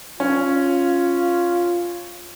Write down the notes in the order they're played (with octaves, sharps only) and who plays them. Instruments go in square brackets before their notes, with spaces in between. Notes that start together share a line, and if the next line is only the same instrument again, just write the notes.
[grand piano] C#4 [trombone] F4